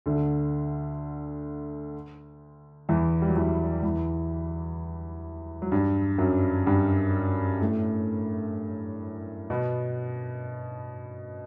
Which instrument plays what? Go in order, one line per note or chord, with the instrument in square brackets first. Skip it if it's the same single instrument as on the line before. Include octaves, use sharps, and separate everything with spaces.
[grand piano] D2 D3
E2 E3
G3
F#3
E2 E3
E2 E3
F#3
G2 G3
F#2 F#3
G2 G3
A2 A3
B2 B3